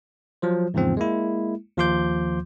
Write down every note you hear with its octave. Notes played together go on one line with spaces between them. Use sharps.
F3 F#3 C5
E2 G#2 C#3 F3 C4
G#3 A#3 E4
D#2 F3 F4 C6 D6 G6